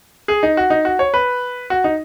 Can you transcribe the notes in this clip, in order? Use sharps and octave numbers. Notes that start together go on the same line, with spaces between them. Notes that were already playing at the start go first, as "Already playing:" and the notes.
G#4
D#4
F#4
D#4
F#4
C#5
B4
F#4
D#4